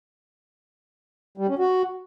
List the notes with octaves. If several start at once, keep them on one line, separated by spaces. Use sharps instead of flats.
G3
C#4
F#4